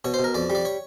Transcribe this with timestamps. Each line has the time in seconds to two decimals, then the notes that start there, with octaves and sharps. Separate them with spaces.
0.05 B2 C#5
0.14 C5
0.19 B2
0.24 A#4
0.34 F2 D5
0.50 G3
0.55 D5
0.65 C#5